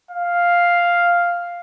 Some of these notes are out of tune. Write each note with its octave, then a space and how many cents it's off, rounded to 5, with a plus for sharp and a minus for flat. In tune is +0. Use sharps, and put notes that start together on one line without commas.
F5 +0